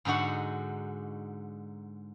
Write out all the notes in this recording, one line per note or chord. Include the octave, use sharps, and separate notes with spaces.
G#2 D3 D#4 F#4 F#5